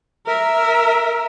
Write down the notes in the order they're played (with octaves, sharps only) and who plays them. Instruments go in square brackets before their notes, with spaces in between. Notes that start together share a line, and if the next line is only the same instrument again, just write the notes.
[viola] A#4 E5